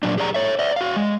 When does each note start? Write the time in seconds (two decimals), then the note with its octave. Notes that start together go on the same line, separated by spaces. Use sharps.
0.03 A#2 F#3 D4
0.18 G4 G#4 D5 F5 A#5
0.34 C#5 E5
0.59 D5 E5
0.76 F#4 F5
0.96 G#3